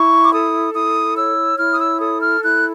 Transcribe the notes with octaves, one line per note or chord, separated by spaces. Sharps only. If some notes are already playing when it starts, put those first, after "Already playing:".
Already playing: E4 C#6
D6
A4 D#6
E4 D#6
C#5 E6
E4 F6
D#6
E6
A4 D#6
F6
E4 F#6